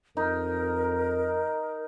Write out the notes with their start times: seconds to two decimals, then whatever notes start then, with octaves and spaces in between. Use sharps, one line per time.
0.17 F2 D#4 A#4